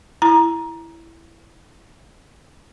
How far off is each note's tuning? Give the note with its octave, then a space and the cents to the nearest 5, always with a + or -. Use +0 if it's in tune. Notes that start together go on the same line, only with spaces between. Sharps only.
E4 +5 A#5 +15